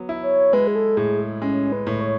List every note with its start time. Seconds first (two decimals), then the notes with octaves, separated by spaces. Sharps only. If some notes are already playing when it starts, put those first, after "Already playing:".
Already playing: F#3 B3
0.09 E4
0.23 C#5
0.53 G#3 B4
0.67 G#4
0.75 A4
0.97 A2 G#4
1.42 G#3 C#4
1.72 B4
1.87 A2
2.01 C#5